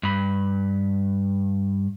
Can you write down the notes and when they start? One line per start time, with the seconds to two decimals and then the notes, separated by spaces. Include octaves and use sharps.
0.03 G2 B5